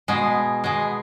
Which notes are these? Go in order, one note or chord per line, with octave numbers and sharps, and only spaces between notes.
B2 G#3
B2 G#3